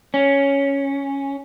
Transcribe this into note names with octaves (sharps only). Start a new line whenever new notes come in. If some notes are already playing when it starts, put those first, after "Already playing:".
C#4